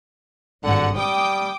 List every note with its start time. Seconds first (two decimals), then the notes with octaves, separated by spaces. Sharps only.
0.64 G#1 G2 D3 F#5
0.96 G3 G5 D6 D#6